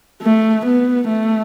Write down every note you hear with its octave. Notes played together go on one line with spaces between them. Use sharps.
A3
B3
A3